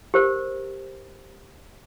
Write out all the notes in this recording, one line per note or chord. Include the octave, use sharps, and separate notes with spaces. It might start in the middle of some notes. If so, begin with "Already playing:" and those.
G4 A#4 C5